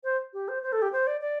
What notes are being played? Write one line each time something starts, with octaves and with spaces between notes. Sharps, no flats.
C5
G4
C5
C5
A4
G4
C5
D5
D5